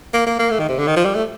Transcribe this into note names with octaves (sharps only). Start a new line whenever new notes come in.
A#3
A#3
A#3
A3
D#3
C3
D3
D#3
F3
G3
A3